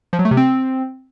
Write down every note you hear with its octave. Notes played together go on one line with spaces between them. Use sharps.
F3
F#3
A3
C3
C4